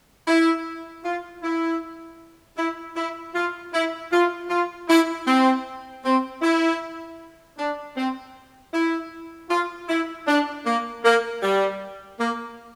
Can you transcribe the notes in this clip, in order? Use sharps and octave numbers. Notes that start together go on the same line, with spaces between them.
E4
F4
E4
E4
E4
F4
E4
F4
F4
E4
C4
C4
E4
D4
C4
E4
F4
E4
D4
A#3
A#3
G3
A#3